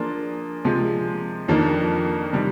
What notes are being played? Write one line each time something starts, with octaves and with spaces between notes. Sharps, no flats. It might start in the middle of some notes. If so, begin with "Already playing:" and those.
Already playing: F3 A#3 D4 F4 G#4
C3 F3 G#3
F2 D#3 A#3 D4
C3 D#3 G3